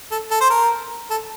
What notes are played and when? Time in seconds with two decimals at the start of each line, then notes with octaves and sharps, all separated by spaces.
0.11 A4
0.31 A4
0.41 C5
0.50 A#4
1.10 A4